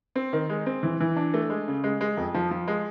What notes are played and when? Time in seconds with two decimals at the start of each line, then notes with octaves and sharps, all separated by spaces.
0.16 C4
0.33 D#3
0.49 G#3
0.66 C4
0.83 E3
1.00 E3
1.16 D4
1.34 A3
1.50 G#3
1.68 C#3
1.84 G#3
2.01 G#3
2.17 F2
2.34 F3
2.51 F3
2.68 G#3